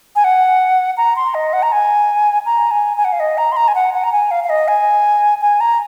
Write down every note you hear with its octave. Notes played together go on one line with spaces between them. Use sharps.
G#5
F#5
A#5
C6
D#5
F#5
A#5
G#5
A#5
G#5
G#5
F#5
F5
D#5
A#5
C6
A#5
G#5
F#5
F#5
A#5
G#5
F5
F5
D#5
G#5
G#5
A#5